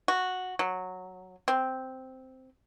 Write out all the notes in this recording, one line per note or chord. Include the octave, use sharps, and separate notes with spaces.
F#4
F#3
C4